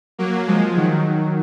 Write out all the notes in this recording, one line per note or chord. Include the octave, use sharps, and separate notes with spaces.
F#3 A#3
F3 G#3
D#3 F#3